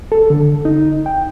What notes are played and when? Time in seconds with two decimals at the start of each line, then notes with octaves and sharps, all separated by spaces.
0.12 A4
0.30 D3
0.65 D#4
1.06 G5